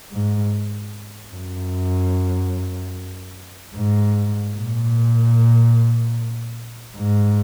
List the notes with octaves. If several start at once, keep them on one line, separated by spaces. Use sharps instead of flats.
G#2
F#2
G#2
A#2
G#2